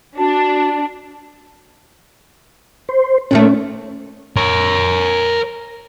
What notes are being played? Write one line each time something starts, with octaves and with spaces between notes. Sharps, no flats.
D4 F#4 A5
C5
A#2 D#3 A3 C#4
A#4 C#5